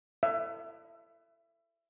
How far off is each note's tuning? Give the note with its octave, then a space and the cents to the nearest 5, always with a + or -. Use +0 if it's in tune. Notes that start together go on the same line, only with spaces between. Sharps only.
E5 +25